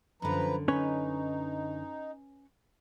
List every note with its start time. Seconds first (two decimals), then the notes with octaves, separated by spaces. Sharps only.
0.22 F#2 D3 F3 B4 A#5
0.68 C#4 D#4 B4 C#5